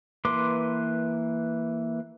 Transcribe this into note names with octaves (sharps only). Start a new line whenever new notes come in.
E3 A#3 B4 C6 D6